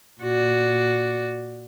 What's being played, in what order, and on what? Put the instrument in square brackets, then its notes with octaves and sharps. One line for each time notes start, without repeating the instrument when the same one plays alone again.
[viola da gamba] A#2 F#4 D5